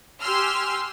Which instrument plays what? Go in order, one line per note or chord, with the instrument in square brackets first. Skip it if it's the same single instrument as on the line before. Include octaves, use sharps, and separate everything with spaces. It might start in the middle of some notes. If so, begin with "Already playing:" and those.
[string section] G4 G#5 C6 E6 F6